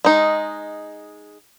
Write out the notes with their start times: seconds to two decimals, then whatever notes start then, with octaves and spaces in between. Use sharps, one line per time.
0.05 G#3 D#4